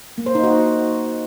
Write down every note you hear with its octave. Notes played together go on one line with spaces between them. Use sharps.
A#3
C5
D#4
F#4